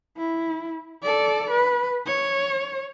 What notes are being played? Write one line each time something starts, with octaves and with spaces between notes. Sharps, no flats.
E4
A4 D5
B4
C#5